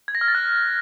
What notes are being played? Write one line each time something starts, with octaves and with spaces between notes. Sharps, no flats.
G#6
A#6
F6
A6
F#6